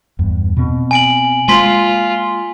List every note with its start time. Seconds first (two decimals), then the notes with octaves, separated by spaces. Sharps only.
0.19 E2 G2
0.57 B2 C4
0.91 G#5 D7 F#7
1.48 G#3 A#3 F4 G#5 C6 B6